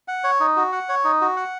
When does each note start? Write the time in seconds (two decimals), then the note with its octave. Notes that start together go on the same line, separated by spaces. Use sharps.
0.08 F#5
0.24 C#5
0.40 D#4
0.56 F#4
0.72 F#5
0.89 C#5
1.04 D#4
1.21 F#4
1.36 F#5